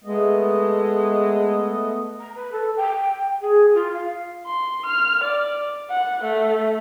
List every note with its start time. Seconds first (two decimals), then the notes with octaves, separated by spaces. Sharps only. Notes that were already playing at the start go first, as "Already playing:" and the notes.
0.04 G#3 A3 B3 D#5
2.19 A#5
2.35 B4
2.52 A4
2.77 G5
3.41 G#4
3.74 F4
3.93 F5
4.46 C6
4.86 F6
5.24 D5
5.90 F#5
6.23 A3